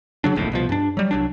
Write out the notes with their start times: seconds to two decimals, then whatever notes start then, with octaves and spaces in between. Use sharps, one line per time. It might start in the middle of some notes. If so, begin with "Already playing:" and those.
0.24 C#3 F#3 D4
0.35 F1 A#1 D#2 A2
0.52 C2 B2 F3
0.69 G2 D4
0.97 F#3 G3
1.11 C2 F#3 D4